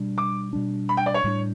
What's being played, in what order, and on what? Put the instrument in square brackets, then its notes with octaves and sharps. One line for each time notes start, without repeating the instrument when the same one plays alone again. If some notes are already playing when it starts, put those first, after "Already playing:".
Already playing: [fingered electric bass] B2 G3 D4
[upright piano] D6
[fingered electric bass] B2 G3 D4
[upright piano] B5
G5
D5
C#5
[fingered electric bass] A2 G3 B3 D4